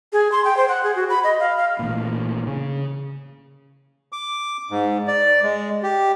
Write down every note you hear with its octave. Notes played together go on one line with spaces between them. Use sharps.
G#4
C6
G5
C5
F#5
G#4
F#4
B5
D#5
F5
F5
A1 A#2
C#3
D6
G#2
D5
G#3
G4